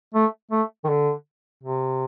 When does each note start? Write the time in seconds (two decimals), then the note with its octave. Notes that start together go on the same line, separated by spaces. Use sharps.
0.14 A3
0.51 A3
0.84 D#3
0.89 D3
1.63 C3